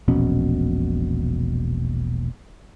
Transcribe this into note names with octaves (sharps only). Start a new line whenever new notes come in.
E1 A#1 B2 C#4